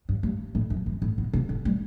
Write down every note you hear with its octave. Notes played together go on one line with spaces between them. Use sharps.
G2
G2
A2
F#2
F#2
A2
B2
C3
D3
G3